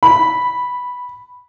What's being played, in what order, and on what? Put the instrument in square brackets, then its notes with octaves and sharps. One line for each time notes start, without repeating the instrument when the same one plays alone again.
[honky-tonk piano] B5